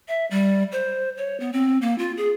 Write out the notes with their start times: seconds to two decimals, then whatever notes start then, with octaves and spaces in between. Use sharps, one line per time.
0.08 E5
0.31 G3
0.72 C5
1.17 C#5
1.40 B3
1.53 C4
1.82 A#3
1.98 F4
2.17 G#4